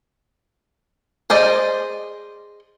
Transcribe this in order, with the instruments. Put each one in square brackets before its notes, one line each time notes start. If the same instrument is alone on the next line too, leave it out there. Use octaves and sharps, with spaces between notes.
[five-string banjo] G#4 C5 D5 D#5